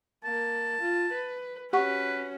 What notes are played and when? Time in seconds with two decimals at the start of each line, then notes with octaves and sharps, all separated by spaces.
0.24 A#3 A5
0.81 F4
1.12 B4
1.73 C#4 F#4 G4 B4 F#5 C#6